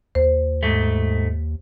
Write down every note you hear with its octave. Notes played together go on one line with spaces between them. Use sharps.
D#2 C5
G#2 A3